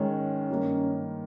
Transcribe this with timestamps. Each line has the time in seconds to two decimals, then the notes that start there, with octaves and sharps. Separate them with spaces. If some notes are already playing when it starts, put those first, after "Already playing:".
Already playing: G#2 D#3 G#3 C#4
0.50 G2 D#3 A#3 D#4